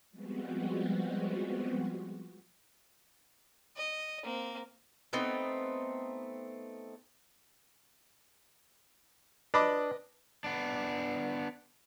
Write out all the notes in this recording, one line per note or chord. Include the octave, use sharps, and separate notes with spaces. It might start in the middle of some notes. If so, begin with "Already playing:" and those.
F3 G3 G#3 B3 C4 F#4
D#5
A#3 C4
A3 B3 C4 D#4
D4 B4 D#5 B5 D6 D#6
B3 D4